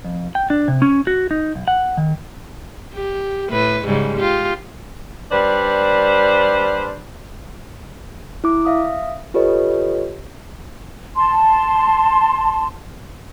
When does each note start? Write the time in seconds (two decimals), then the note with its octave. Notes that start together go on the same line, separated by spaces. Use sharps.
0.05 F2
0.35 G5
0.50 D4
0.68 C3
0.82 C#4
1.07 F#4
1.31 D#4
1.55 B1
1.68 F#5
1.97 D#3
2.95 G4
3.49 A2 B4
3.84 G#2 C#3 G3
4.17 F4 G4
5.31 G3 D4 B4 C5 D5
8.44 E4 D6
8.65 E5 F5 D#6
9.34 F4 G4 A4 B4 C#5 D#5
11.16 A5 C6